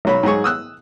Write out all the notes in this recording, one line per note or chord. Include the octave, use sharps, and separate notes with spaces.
B1 F#3 B5
G#2 F#3 G#4 C#6
D#6 E6 F#6